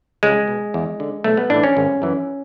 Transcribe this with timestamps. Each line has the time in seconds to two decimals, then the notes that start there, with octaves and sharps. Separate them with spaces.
0.23 C#2 G#3
0.48 B2
0.74 E2
1.00 D3
1.24 B1 A3
1.37 B3
1.50 A2 E3 D4
1.63 C#4
1.77 G#1
2.02 F#2 E3